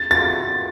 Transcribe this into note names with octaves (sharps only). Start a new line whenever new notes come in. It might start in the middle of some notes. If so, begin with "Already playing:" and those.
Already playing: A6
A6